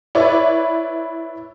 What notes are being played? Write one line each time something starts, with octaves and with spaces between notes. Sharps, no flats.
E4 B4 C#5 D5